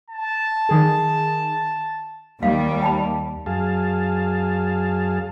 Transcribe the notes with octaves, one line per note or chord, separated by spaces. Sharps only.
A5
D#3 G#4
D#2 G3 F5
G5 A5 B5
F#2 G#4 F5 A5